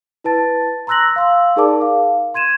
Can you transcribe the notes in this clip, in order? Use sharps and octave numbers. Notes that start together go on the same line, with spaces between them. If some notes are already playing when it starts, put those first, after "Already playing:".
E4 B4 A5 A6
A#5 C6 E6 F#6 A#6 F#7
F5 C6 E6
D#4 G#4 A#4 D5 A5 D6
F5
C6 G#6 D#7 E7